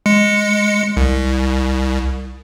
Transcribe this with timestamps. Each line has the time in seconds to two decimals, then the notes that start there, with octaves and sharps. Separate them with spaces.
0.06 G#3 C#7
0.97 C2